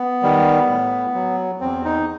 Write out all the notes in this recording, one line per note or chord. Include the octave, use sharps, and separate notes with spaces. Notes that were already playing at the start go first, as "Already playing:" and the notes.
Already playing: B3
D#3 G3
A2
F#3
E2 C4
D#4